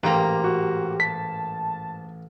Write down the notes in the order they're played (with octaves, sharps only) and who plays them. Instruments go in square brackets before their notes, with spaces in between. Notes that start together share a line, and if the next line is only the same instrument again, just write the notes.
[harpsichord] A1 G5 A#5 [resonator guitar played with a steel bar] G#2 A#3 [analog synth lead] G4
[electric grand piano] F#4
[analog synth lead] A5 [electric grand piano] B6